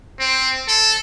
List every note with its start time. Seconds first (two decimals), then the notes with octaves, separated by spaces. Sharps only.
0.19 C4
0.68 A4